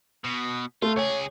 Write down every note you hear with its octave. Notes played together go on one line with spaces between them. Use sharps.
B2
A3 F4
C#2 G#4 C#5